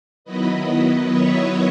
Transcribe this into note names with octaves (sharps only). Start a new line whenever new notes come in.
D#3 F#3 B3 E4 B4 D#5
C#5 E5